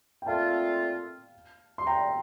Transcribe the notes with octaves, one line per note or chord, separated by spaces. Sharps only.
G5
A#2 A3 C4 F4 F5 A5
C6
G5 A#5